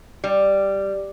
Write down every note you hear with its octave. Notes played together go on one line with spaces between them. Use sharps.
G3